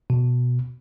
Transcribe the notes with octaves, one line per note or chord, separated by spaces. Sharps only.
B2